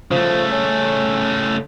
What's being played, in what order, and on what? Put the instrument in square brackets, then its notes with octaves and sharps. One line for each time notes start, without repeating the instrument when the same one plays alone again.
[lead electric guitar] C#3 A3 [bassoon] F3
[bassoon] C#4